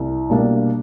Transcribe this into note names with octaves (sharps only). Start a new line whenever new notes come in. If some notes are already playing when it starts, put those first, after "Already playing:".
Already playing: C2
B2 G3 A#3 D4